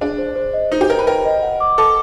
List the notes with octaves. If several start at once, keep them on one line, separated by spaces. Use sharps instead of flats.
D4 G#4
C5
C5
D#5
D#4 C5
G4
A#4 G5
B4
A#4 G5
D#5
F#5
D6
A4 D6